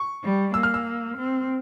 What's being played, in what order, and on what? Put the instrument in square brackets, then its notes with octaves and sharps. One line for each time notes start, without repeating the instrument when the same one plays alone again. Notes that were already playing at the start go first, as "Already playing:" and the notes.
Already playing: [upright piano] C#6
[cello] G3
[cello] A#3 [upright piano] E6
[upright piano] F6
E6
[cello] C4